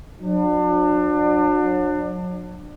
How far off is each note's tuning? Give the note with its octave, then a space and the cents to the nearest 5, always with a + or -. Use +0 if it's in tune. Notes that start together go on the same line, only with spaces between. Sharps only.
F#3 -35 D4 +30